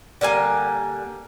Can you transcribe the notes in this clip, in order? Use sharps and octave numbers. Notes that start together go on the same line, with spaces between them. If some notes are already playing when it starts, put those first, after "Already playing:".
D3 G3 A#3 G#5